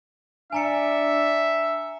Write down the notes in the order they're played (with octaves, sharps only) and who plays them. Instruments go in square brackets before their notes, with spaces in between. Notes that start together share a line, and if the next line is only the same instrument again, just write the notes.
[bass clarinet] D4 [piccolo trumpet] E5 [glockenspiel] G#5 A#5 C#7